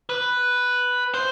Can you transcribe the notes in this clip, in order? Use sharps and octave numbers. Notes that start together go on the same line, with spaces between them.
B4
C5